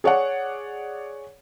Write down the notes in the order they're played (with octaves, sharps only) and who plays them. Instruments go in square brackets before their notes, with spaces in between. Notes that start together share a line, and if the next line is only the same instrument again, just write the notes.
[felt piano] G#4 C#5 D5 F#5